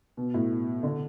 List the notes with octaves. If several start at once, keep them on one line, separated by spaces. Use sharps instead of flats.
B2
A2
D3